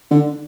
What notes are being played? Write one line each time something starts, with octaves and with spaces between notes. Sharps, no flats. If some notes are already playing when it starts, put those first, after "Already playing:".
D3